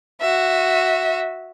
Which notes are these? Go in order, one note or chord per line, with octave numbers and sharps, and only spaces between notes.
F#4 E5